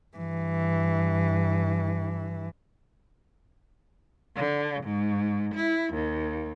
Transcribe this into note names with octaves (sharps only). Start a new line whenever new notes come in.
G2 E3
D3
G#2
E4
D#2